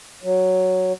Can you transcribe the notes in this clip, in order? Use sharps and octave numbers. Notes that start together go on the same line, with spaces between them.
F#3